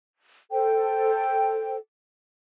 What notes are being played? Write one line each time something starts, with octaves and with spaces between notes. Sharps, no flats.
A4 C5 G5